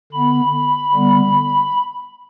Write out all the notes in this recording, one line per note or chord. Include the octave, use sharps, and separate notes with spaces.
D3 B3 B5
B5
D3 G3 B3